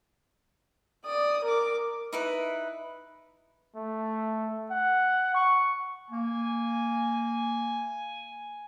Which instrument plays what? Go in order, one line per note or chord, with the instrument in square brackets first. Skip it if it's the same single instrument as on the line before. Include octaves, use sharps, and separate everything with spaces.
[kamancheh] D5 D#6
A#4 D6
[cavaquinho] D#4 E4 B4
[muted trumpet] A3
F#5
C#6
[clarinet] A#3 [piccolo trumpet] G#5